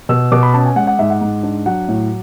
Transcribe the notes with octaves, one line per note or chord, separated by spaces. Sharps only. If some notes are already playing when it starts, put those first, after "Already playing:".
B2 E6
B2 D6
B5
C#4 A5
G#5
G#3 F#5
F#5
G#2 E5
F#5
G#2
D4
F#3 F#5
A2